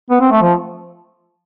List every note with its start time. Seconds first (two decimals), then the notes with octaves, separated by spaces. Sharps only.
0.10 B3
0.21 C4
0.31 A3
0.42 F3